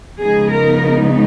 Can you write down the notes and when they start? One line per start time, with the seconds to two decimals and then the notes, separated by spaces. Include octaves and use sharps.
0.20 C#3 F3 G#3 B3 D#4 G#4
0.52 A#4